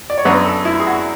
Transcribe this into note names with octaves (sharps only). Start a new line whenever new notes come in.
D5
C#5
F#2 C#3 F#3 B3 D4 B4
A4
E4
G#4
F#4